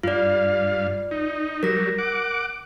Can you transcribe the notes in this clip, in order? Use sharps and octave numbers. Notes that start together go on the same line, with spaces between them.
G2 F4 D5 F5
D#4
F#3 G3 A#4 A#6
F#5 D6